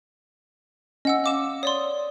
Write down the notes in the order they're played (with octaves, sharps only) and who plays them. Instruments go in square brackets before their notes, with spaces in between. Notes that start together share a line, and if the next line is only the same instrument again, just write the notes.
[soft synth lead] C#4 [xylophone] D#5 F#5 E6
[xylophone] F5 D6 E7
[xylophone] C#5 D5 C6 [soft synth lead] D#6